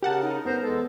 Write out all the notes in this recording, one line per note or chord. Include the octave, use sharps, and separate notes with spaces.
C#3 G4 A#4 F#5 A5
D#4
B3 A#4 C5 A#5
E2 G#3 A4